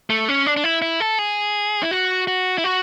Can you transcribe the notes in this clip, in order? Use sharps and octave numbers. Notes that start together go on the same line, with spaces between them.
A3
C#4
D4
D4
E4
E4
A4
G#4
E4
F#4
F#4
E4
F#4